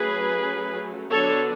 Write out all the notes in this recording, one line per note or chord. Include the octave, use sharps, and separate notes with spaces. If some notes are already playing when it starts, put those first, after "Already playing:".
Already playing: F#3 A3 C#4 G#4 B4
D3 F#3 B3 D4 A4 C#5